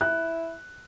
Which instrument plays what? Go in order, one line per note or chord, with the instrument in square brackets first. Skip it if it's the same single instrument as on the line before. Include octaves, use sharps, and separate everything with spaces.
[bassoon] E4 [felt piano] F#6